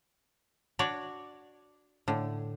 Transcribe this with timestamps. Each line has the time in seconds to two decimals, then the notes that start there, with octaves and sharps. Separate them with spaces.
0.79 D4 F#4 C#5 D5
2.08 A2 D3